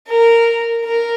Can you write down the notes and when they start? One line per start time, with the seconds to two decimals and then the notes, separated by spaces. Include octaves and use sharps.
0.08 A#4
0.84 A#4